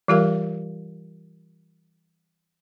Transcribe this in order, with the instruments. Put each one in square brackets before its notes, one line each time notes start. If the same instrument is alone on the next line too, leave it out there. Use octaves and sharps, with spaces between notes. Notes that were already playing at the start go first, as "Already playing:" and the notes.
[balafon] E3 G3 F4 G4 A#4 F5